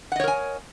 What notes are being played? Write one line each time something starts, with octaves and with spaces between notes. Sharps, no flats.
A#4 C#5 D#5 F#5 G#5